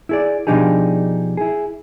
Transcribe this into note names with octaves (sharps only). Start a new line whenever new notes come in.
E4 G#4 D5
B2 F3 D4 D#4 G4 G#4
E4 G#4